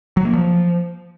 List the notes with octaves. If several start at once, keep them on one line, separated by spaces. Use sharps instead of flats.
F#3
A#3
F3